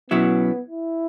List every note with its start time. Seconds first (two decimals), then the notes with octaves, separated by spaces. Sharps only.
0.10 B2 F#3 B3 C#4 E4
0.67 E4